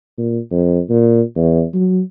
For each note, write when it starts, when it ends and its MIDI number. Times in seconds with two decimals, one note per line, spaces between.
0.18 0.39 46
0.51 0.80 41
0.90 1.22 46
1.36 1.64 40
1.74 2.01 54